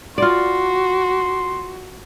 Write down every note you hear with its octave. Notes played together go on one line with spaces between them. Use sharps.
F4 F#4 D5 C6